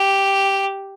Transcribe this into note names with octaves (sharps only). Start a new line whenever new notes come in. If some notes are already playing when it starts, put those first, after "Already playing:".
Already playing: G4